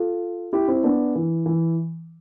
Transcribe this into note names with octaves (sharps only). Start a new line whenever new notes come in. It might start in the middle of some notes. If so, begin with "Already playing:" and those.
Already playing: F4 A4
E4 G4
C4 E4
B3 D4
E3
E3